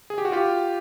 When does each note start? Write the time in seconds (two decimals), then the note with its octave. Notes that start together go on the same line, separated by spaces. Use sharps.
0.10 G#4
0.18 G4
0.25 F#4
0.32 F4 G4